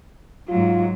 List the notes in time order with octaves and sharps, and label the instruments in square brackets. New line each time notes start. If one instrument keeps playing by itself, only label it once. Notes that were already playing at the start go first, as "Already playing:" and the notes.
[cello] G#2 F#3 [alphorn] F4